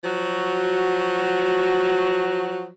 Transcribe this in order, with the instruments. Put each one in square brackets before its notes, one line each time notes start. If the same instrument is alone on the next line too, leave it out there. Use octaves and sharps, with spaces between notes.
[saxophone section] F3 F#3 F#4